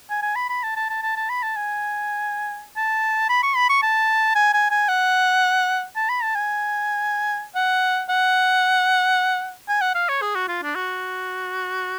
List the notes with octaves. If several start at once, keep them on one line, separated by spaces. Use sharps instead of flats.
G#5
G#5
B5
B5
A5
A5
A5
A5
A5
B5
A5
G#5
A5
B5
C#6
B5
C#6
A5
G#5
G#5
G#5
F#5
A5
B5
A5
G#5
F#5
F#5
G#5
F#5
F5
C#5
G#4
F#4
F4
D4
F#4